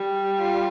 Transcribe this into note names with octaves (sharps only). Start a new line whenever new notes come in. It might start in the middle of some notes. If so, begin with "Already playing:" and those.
Already playing: G3
F4